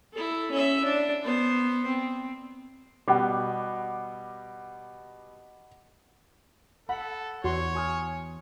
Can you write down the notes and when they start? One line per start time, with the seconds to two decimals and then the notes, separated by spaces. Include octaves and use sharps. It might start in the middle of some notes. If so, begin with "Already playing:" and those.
0.13 E4 A4
0.51 C#4 E5
0.84 D4
1.23 B3 C5
1.86 C4
3.08 B2 G3 F#5 D6
6.89 A4 F#5 B5
7.44 E2 F#4 C#5 C6
7.75 G#5 D#6 F6